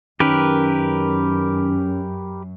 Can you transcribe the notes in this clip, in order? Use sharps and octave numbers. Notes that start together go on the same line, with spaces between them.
F#2 D#3 C#4 G4 A#4 B4